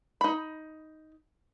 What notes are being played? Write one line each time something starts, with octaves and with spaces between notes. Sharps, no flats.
D#4 B5